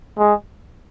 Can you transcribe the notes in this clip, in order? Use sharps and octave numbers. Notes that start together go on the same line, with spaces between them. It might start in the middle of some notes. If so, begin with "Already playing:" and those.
G#3